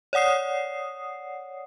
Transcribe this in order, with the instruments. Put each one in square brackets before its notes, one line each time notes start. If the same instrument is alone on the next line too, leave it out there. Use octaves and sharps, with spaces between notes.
[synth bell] C#5 D5 F#5 D#6 C7